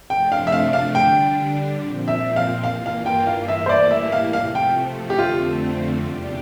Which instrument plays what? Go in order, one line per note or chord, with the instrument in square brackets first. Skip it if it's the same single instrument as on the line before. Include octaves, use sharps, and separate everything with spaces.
[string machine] C3 F3 A3 D4 [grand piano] G5
[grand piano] F5
E5
F5
F5
[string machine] D3 G3 D4 [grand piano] G5
[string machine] A#2 F3 C4
[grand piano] E5
F5
[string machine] G2 E3 A#3 F4 [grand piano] F5
[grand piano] F5
G5
F5
[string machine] A2 E3 G3 A#3 E4 [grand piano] E5
[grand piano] C5
D5
E5
F5
[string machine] C3 F3 A3 [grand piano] F5
[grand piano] G5
G4
[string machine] F2 D3 A3 C4 [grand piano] F4
[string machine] E2 C3 G3 D4 G4